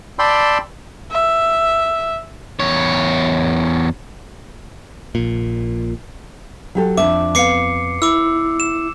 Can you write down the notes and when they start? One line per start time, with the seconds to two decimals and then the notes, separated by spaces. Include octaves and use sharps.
0.19 D5 G5 A5 B5 C6 E6
1.12 E5
2.60 E2 C#5
5.15 A#1 A#2
6.75 F#3 G4 A4
6.97 F2 D4 E5 D6
7.35 F2 B3 F5 D6 C7 C#7
8.02 E4 D6 E6
8.60 E7